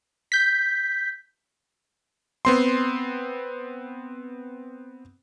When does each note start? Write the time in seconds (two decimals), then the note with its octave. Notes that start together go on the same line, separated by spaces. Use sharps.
0.32 G6 B6
2.45 B3 C4 C6